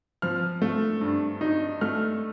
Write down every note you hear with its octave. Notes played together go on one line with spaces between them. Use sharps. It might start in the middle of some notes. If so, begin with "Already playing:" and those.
F3 F6
A3
G2
D#4
A3 F6